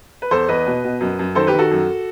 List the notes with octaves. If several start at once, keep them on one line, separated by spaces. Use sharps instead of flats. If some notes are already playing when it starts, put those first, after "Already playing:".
B4
E2 A4 C5
E2 B4 D#5
B2
B2
F#2
F#2
D#3 A4 C5
G4 B4
D#3
F#4 A4
F#2